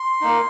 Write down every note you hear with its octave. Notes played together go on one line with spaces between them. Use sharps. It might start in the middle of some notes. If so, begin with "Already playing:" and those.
Already playing: C6
A#3 D#4